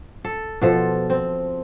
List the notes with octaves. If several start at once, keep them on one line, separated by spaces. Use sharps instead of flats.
A4
B2 F3 A4
C4